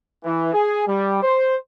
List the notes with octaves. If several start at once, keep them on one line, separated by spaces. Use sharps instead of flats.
E3
G#4
G3
C5